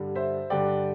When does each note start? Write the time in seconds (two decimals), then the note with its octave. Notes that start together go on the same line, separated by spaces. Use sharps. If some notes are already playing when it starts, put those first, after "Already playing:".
Already playing: G2 D3 G3
0.15 C5 E5
0.50 G2 D3 G3 D5 G5